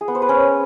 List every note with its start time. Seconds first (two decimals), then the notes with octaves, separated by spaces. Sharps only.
0.01 G#4
0.08 B3
0.15 C5
0.22 B4
0.29 C#4